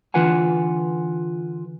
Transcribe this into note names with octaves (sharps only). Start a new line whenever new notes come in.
D3 E3 F4 B4 F#5 G#5